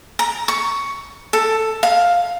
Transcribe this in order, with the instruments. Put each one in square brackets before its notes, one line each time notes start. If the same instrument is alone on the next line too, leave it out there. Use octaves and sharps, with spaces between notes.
[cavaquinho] A#5
C#6
A4
F5